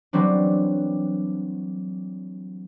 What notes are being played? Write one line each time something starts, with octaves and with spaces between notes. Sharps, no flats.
E3 F#3 G3 C4 D4